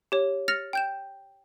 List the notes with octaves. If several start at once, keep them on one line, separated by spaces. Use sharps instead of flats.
G4 C#5
F6 A6 A#6 C#7 F7
G5 G6 E7